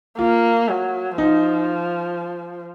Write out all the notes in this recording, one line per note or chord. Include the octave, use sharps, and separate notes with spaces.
A#3 F4
F#3
F3 D#4